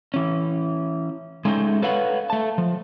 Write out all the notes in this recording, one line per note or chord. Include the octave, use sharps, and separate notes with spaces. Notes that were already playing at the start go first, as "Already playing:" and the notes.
E3 C#4
G#3 A3 C#4 D#4 C5 G5
A4 B4 C#5 F5 F#5
A3 A5
F3